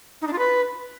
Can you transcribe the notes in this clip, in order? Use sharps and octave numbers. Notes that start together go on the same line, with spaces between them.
D#4
D4
F4
B4